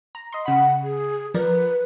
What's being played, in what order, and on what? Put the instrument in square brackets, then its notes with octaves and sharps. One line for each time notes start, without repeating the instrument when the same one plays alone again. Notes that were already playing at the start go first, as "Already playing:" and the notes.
[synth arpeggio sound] A#5
D#5 C6
[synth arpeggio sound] C#3 B5 [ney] F#5
[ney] G#4
[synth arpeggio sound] F3 A#4 D5 [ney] B4